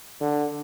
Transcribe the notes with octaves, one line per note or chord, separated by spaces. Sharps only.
D3